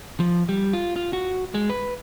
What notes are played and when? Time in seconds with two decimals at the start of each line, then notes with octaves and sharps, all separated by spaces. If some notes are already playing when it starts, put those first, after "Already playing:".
0.20 F3
0.49 G3
0.73 F4
0.96 F4
1.13 F#4
1.55 G#3
1.70 B4